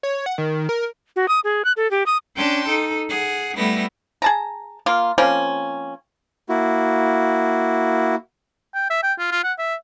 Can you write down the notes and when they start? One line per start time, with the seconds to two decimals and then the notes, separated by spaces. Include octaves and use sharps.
0.03 C#5
0.26 F#5
0.38 D#3
0.69 A#4
1.16 F#4
1.28 D#6
1.44 G#4
1.65 F#6
1.77 A4
1.91 G4
2.06 D#6
2.36 C#4 D4 G5 A5 C6
2.67 D#4 A4
3.09 G#4 F#5
3.56 G3 A3 B3 E4 A#6
4.22 G#4 A5 A#5
4.86 A#3 F4
5.18 F3 A#3 C4 C#4
6.49 A#3 E4 F#4
8.74 G5
8.90 E5
9.03 G5
9.19 F4
9.31 F4
9.44 F#5
9.58 E5